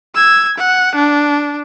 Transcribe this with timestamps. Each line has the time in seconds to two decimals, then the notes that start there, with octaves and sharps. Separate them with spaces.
0.15 E6 G#6
0.58 F#5
0.95 D4